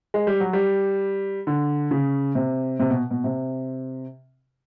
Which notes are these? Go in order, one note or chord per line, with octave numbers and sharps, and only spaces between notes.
G#3
G3
F#3
G3
D3
C#3
C3
C3
B2
B2
C3